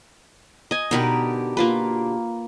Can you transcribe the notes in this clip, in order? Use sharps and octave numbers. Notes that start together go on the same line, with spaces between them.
D#5 G#5
B2 D3 D#4 G4 A#4 B4
A#3 F4 B4